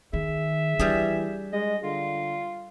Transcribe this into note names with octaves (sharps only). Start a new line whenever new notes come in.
D#3 G#4 E5
E3 G3 D4 G#4
G#3 D#5
D3 F4